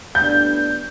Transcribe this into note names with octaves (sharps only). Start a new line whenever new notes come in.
A2 G3 B3 D4 G6